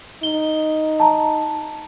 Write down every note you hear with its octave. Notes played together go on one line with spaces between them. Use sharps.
D#4 G7
A5 A#5